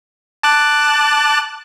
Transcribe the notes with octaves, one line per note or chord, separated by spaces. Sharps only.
A5 D6 F#6